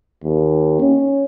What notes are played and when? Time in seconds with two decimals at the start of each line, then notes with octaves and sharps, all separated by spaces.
0.24 D#2
0.81 C#4